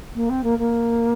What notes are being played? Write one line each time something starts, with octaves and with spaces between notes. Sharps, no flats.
A#3
C4
A#3
A#3